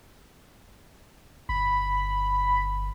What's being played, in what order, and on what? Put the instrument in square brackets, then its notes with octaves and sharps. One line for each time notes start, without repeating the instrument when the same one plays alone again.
[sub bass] G1 [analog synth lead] B5